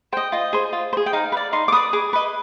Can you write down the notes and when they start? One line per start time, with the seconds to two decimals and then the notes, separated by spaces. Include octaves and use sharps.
0.12 C5 D#5 G5
0.32 F4 D#5
0.53 G#4 C5
0.73 F4
0.93 C5
0.97 G#4
1.06 G5
1.13 D#4 F5
1.32 B4
1.37 D5
1.53 D#4 C6
1.68 D6
1.72 B4 D5 D#6
1.93 G#4 D6
2.13 B4 D#5